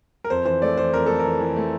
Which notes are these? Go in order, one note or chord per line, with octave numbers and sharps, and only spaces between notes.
A#4
F2 C5
E3 C5
A3 D5
E3 C5
F2 A#4
A3 A4
A#4
E3
E3
A3